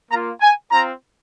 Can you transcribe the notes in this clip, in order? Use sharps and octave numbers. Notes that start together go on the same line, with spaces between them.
A#3 F4 A#5
G#5
C4 F4 A#5